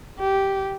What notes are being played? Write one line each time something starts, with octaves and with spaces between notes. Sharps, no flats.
G4